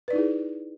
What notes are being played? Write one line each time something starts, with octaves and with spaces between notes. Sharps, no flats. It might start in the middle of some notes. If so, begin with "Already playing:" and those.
D#4 E4 G#4 B4 D5